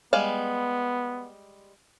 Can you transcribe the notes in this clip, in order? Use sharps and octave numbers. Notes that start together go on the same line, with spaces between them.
G3 G#3 B3 F5